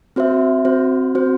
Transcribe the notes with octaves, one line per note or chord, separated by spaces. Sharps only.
C4 F#4 C5 E5
C4 F#4 C5
C4 F#4 C5